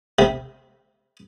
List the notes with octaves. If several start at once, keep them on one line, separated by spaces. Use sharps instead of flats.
C3